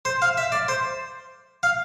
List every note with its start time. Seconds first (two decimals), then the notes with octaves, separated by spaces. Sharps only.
0.05 C5
0.22 F5
0.38 E5
0.52 D5
0.68 C5
1.63 F5